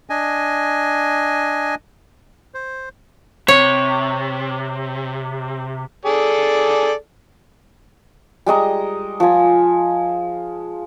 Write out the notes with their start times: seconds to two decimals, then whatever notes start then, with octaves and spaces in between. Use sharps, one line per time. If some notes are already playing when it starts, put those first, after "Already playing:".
0.10 D4 D#5 G#5
2.54 C5
3.48 C3 C#5
6.05 G#4 A4 D5
8.46 G3 G#3 D#5 A#5
9.20 F3 G#5